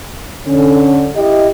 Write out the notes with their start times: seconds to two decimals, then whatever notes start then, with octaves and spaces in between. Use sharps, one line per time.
0.47 D3 C#4
1.16 E4 G4 D#5